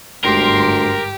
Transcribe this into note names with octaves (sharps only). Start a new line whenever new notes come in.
G1 D2 G#2 G4 A#4 C6